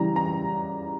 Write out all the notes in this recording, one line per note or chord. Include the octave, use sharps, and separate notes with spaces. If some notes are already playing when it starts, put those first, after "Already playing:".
Already playing: C#3 E3 G3 A#5
A#5